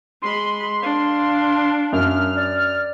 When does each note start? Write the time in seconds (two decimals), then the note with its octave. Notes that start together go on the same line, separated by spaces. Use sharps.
0.22 G#3 B5 C6
0.83 D4 F5
1.93 F#2 F6
2.36 D5